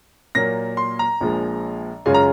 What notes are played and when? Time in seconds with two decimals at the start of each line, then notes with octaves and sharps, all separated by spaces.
0.35 A#2 F#3 A#3 A#6
0.77 C6
0.99 A#5
1.21 A#1 A#2 F3 G#3
2.06 F#2 C#3 G#3 C#4 F4 G#5
2.14 A#5